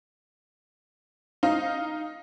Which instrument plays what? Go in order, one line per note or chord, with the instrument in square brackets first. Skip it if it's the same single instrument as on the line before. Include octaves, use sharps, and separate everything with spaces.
[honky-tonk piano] D#4 F5